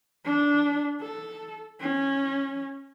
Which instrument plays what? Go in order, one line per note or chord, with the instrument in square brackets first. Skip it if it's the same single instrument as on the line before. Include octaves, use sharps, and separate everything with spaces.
[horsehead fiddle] D4
A4
C#4